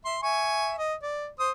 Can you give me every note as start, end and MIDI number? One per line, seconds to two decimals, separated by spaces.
0.05 0.18 76
0.05 0.18 84
0.23 0.74 76
0.23 0.74 80
0.23 0.74 85
0.78 0.94 75
1.02 1.27 74
1.40 1.51 72
1.40 1.51 87